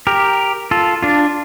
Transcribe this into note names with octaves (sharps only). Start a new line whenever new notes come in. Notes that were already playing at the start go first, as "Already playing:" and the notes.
G4 A#4
F4 A4
D4 F4